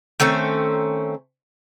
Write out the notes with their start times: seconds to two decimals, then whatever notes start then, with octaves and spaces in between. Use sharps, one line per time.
0.20 D#3 A3 C4 C#4